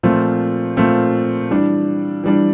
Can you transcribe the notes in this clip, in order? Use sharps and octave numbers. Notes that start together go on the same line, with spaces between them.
A#2 F3 A3 C4 F4
A#2 F3 A3 C4 F4
E3 G3 D4
E3 G3 D4